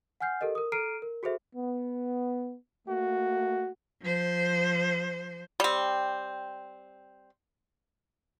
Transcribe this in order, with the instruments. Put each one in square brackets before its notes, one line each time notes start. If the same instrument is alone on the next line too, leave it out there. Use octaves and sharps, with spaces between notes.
[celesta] F#5 G#5 F6 G6 C7
G4 A4 A#4 D#5
A#4 D#6
A4 A#5 F6 C7 D7 D#7
A#4
F#4 G#4 A4 C5 E5
[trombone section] B3
A3 A#3 F#4
[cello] F3 C5
[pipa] G3 C4